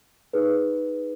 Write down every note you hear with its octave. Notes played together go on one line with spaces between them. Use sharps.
D#4 G#4 B4